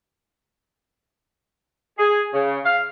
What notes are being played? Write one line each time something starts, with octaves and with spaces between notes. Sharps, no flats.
G#4
C#3
F5